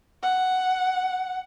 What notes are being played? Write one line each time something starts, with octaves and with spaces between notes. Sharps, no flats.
F#5